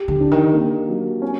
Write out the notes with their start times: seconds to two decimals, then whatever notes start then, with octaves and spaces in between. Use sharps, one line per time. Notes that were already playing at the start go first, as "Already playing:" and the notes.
Already playing: G4
0.08 D3
0.20 D4
0.31 D#3
0.53 A#3
0.88 F#3
1.22 C#4